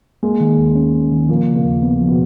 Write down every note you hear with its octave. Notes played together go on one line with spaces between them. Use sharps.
G#3 A#3
D#3
D#2
C#4
A#3
D#3
A#2 F3 A#3
C#3
A#2 A#3
D#2
B3
F3
B2 B3